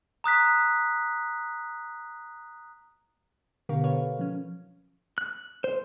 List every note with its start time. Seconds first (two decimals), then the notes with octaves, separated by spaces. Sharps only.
0.24 A#5 D#6 F#6 B6
3.69 B2 D3 G4 A#4 F5 C#6
3.84 A4 B4 C#5 F5
4.19 F3 C#4
5.18 F#6
5.64 C5